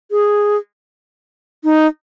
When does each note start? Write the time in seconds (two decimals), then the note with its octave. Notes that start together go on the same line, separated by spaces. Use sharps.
0.11 G#4
1.64 D#4